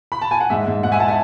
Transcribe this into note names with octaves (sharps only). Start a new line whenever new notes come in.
B5
A5
G#5
F#5
G#2 E5
G#2
G#2 F#5
E5 G#5
F#5 A5
E5 G#5